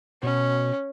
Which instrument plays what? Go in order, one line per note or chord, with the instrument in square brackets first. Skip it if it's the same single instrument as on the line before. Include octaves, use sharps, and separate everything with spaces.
[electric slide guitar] B2 F#4 [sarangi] C#4